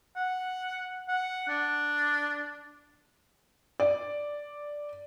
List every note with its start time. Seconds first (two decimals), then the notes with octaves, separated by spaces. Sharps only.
0.16 F#5
1.09 F#5
1.49 D4
3.80 D5